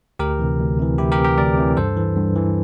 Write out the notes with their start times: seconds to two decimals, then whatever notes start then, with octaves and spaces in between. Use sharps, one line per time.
0.19 D2 G4 A#4
0.39 C3 E3
0.59 D2
0.79 C3 E3
0.98 D2 E4 G4
1.12 G4 A#4
1.18 C3 E3
1.25 G4 A#4
1.38 D2 A#4 D5
1.57 C3 E3
1.77 G2 A4 C5
1.97 E3
2.16 G2
2.36 E3